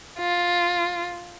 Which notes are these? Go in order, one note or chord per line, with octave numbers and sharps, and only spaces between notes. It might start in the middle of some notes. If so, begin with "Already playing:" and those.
F4